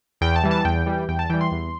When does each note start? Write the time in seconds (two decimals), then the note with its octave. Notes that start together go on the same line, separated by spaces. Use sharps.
0.21 E2 G5
0.36 A5
0.44 E3 G3
0.51 A5
0.65 E2 G5
0.86 E3 G3
1.09 E2 G5
1.19 A5
1.30 E3 G3 G5
1.41 C6
1.52 E2